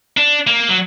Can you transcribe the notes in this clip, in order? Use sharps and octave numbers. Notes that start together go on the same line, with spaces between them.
D4
A#3
F#3